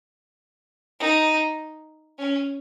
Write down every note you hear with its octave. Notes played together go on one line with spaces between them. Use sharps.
D#4
C#4